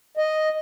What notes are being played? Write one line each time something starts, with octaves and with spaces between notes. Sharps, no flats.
D#5